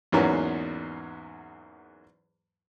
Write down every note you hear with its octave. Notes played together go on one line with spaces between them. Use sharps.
E2 G#2 F#3 A#3 B3 C#4